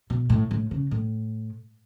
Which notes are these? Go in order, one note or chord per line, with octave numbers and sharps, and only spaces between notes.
B2
A2
A2
C#3
A2